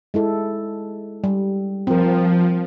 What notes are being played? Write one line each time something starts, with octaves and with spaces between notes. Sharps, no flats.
G#3 E4 A4
G3
F3 C4 A#4